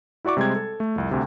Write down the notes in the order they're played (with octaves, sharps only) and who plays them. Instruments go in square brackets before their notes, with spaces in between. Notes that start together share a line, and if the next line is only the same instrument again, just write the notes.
[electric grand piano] E4 F#4 D5 C#6 D6
C3 G3 G#3 C5 G#6
A4
A3
C2 F2
D2 C3